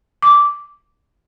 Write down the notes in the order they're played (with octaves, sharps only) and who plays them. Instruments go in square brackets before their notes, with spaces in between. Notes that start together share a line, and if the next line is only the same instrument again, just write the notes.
[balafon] D6